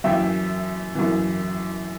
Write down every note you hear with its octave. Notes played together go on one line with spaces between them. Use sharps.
F#2 E3 E5 G5
F#2 E3